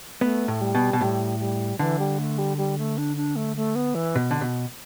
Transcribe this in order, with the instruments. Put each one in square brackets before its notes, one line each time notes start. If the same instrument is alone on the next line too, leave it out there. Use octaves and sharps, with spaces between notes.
[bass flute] A3 [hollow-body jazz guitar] B3
[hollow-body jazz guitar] A2
[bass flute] G3
[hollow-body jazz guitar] B2
B2
[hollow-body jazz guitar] A2 [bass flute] G3
[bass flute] G3
[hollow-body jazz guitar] D3 [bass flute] E3
[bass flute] G3
A3
G3
G3
A3
D4
D4
A3
A3
B3
E3
[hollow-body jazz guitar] B2
D3
B2